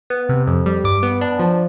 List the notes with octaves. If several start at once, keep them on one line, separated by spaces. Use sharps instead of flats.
B3
C3
F2
G3
G2 D6
B3
D4
F3